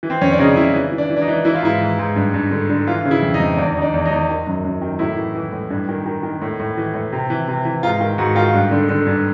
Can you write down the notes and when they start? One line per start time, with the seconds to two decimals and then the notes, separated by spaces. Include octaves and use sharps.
0.03 E3
0.10 C4
0.22 F2 C#4
0.32 D4
0.39 C#3 D#4
0.56 C#3 E4
0.74 E3
0.92 E3
0.98 D4
1.10 E3
1.16 D4
1.22 D#4
1.28 E3
1.45 E3 E4
1.55 F4
1.63 G#2 E4
1.80 E3
1.99 G#2
2.16 G2
2.34 G2
2.51 D3
2.69 D3
2.87 E3 F4
3.05 C#3
3.11 E4
3.22 F2
3.34 D#4
3.40 F2
3.57 E2 D4
3.76 E2 D#4
3.82 D4
3.94 E2
4.06 D#4
4.11 E2
4.29 D#3
4.47 F#2
4.65 F#2
4.81 D#3
4.99 A2 E4
5.17 E3
5.35 E3
5.53 A2
5.70 G2
5.89 D#3
6.06 D#3
6.23 D#3
6.42 A2
6.60 A2
6.77 E3
6.94 A2
7.13 C3
7.30 E3
7.48 C3
7.65 E3
7.83 G#2 F4
8.00 D#3
8.18 G#2 F#4
8.36 D#3 F4
8.54 G2
8.71 D3
8.89 D3
9.07 G2